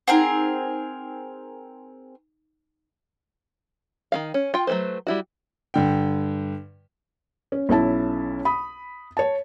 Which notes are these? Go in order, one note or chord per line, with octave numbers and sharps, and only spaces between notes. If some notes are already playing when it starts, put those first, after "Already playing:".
C4 D#4 G#4 A#4 F#5
D#3 C#4 F5
C#4
F4 G5
F#3 A3 C#4 B4 C5
G3 E4 F#4
G2 D3 G5
C#4
B1 C#4 E4 A5
B5 D#6
C#5 A5